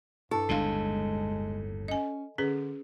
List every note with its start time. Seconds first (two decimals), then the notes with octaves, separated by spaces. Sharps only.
0.31 G2 E4 A4
0.49 G1 D#2 A2 G#3 D4 F5
1.88 C#4 D#5 G#5
2.38 D3 C#4 G#4 B4